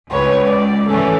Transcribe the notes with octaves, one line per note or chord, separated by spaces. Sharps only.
C#2 B4 C#5
D5
A2 E3 A3 C#4 A4